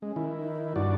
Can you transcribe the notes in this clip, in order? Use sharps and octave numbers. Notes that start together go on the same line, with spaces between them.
G#3 C#4
D#3 E4
D#4
G2 F#4 D5